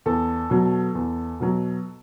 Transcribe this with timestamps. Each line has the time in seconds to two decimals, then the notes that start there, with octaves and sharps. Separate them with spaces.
0.06 E2 A4
0.50 B2 F#3
0.95 E2
1.40 B2 F#3